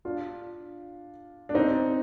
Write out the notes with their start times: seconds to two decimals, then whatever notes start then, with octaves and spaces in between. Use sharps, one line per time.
0.05 D4 F4
1.49 D4
1.55 C4 D#4